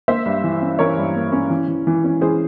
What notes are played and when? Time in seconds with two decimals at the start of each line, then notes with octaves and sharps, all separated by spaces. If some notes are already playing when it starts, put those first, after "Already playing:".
0.08 A#3 C5 E5
0.26 G2
0.44 E3
0.61 C#4
0.79 E3 A#4 C#5
0.98 G2
1.15 A#3
1.32 C#4
1.50 E3
1.68 E3
1.87 E3
2.04 C#4
2.21 E3 G#4 C5